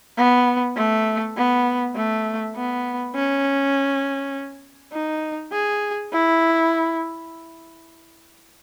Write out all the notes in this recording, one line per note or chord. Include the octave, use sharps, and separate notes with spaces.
B3
A3
B3
A3
B3
C#4
D#4
G#4
E4